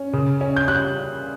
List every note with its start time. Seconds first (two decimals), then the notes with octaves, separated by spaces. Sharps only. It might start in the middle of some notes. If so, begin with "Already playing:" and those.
Already playing: C#4
0.13 C#3
0.41 C#4
0.56 G6
0.68 G3 F#6